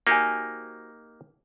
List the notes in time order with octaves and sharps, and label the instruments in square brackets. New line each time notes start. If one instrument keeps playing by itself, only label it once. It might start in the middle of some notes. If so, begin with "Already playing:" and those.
[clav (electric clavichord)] A#3 D#4 G4 [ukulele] F#4 C5 G#5